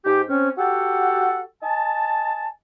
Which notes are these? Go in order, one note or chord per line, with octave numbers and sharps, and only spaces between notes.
G#2 G4
C4 C#4
F#4 G4 A4 F#5
D#5 G#5 A5